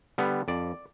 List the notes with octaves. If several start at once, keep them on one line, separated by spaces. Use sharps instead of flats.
D3 G3 B3
F2 D5